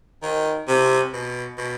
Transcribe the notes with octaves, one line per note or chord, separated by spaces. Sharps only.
D#3
C3
B2
B2